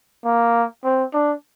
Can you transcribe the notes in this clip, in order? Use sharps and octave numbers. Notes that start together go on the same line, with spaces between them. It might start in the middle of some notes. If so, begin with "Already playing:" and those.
A#3
C4
D4